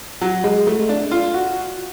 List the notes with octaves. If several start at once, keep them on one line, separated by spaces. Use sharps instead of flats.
F#3
G#3
A3
D4
F4
F#4